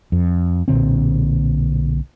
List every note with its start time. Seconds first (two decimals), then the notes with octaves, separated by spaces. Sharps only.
0.12 F2
0.68 B1 A#2 D3 C4